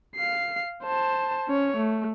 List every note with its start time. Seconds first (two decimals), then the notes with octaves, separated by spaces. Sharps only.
0.16 F5 C7
0.84 C5 A5
1.48 C#4 C#5
1.77 A3